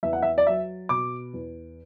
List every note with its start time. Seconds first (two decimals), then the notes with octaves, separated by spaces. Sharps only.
0.03 E2 E5
0.13 F#5
0.23 E5
0.38 D5
0.47 F#3 E5
0.89 B2 D6
1.34 E2